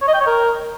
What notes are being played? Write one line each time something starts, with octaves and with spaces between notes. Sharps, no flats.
C#5
D#5
G5
C#5
A#4